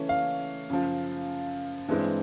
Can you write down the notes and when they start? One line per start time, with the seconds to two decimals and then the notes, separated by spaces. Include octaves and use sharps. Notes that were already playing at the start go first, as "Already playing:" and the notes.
Already playing: C#3 E3 A3 C#4
0.09 F5
0.70 F#2 C#3 F3
1.88 G2 E3 G#3 C4